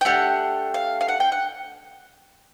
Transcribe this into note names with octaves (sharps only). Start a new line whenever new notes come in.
G5
A3 D4 G4 F#5
F5
F5
F#5
G5
F#5